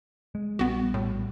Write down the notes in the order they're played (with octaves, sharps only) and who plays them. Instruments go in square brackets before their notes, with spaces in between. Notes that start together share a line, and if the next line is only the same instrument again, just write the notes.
[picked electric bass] G#3
[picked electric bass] A#1 G3 [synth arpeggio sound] B3 F#4
[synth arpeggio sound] A2